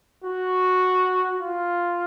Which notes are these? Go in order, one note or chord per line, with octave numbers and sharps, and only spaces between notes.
F#4
F4